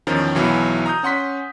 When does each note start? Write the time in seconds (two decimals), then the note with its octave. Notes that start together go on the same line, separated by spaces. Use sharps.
0.07 E2 D#3 F3 C#4 A#5
0.35 B1 B2 E3 F#3 B3
0.86 A#5 D#6 G6
1.03 C#4 F#5 C6 B6